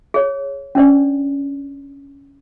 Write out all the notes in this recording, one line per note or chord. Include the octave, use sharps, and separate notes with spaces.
G#4 C#5
C#4 D4 C5 D5